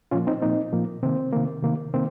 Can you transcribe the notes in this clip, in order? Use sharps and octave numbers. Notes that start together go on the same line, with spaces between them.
A#2 F3 A#3 C#4 F4
C4 D#4
A#2 F3 A#3 C4 D#4
A#2 F3 A#3
C3 D#3 A#3 C4
C3 D#3 A#3
C3 D#3 A#3
C3 D#3 A#3 C4